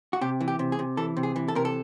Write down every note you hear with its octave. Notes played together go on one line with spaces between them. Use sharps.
F#4
C3 G4
E3
G4
C3
G#4
C3
E3 A4
C3
G#4
E3
A4
C3 A#4
A4